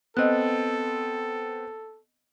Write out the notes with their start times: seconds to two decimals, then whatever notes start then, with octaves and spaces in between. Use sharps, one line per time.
0.17 B3 C4 A4 D#5 F#6